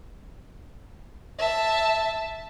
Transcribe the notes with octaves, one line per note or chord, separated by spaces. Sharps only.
E5 A5